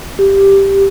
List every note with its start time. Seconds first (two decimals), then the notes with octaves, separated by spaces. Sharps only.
0.19 G4